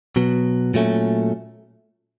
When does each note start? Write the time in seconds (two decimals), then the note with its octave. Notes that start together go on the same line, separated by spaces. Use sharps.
0.16 B2 F#3 B3
0.74 A#2 F#3 A3 C#4